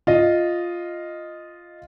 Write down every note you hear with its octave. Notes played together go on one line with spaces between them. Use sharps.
F4 D#5